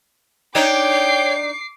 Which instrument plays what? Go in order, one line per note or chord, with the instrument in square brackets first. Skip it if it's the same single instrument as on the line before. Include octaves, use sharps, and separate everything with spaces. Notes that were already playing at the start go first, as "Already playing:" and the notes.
[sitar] D4 D#4 [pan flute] C#5 [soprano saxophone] G5 [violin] D6 C7